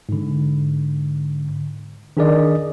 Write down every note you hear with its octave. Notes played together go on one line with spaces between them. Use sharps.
G#2 D3
D#3 D4 G#4 A#4 D5 D#5